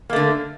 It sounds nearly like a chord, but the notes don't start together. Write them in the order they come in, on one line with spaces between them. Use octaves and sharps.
A#3 A3 D3